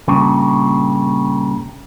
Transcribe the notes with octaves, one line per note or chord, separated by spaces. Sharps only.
G2 A#2 C#3